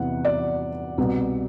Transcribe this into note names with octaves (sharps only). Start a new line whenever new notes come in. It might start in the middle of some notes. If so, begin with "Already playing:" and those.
Already playing: E2 C3 E3 F#5
D5
C2 B2